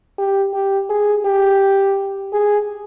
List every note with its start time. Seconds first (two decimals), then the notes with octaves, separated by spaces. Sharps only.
0.18 G4
0.54 G4
0.90 G#4
1.25 G4
2.33 G#4